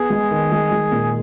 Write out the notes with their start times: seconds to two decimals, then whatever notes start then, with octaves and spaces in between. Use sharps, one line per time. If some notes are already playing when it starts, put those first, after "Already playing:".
Already playing: B3 G#4
0.10 G#3
0.31 D#3
0.52 G#3
0.71 G#3
0.92 A#2